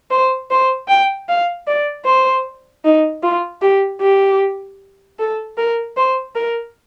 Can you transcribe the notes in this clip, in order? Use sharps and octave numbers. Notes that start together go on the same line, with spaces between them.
C5
C5
G5
F5
D5
C5
D#4
F4
G4
G4
A4
A#4
C5
A#4